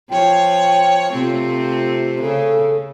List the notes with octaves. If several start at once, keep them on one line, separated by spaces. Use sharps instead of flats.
F3 C#5 G5
C3 A3 C4 F4
C#3 A4